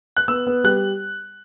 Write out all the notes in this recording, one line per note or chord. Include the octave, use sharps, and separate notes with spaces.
F#6
B3 E6
B3
G3 F#6